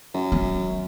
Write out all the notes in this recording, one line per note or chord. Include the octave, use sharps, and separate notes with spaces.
F#2
C#4